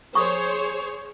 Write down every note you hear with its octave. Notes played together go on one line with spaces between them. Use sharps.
G#4 C5 C#5 C#6 D#6